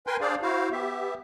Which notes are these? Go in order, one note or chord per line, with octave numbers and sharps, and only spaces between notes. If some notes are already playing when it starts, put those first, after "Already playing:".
A#4 B4 G5 G#5 C6
D4 G#4 C5 D5 F5
E4 F#4 C5 F5
B3 G4 E5